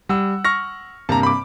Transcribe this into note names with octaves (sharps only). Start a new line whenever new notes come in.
G3 F#5 E6
C#6 F6 A#6
G2 C3 A#3 A5 A#5
B5 D6